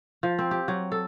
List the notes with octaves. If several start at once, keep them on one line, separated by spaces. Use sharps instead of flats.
F3
C4
G4
F#3
A4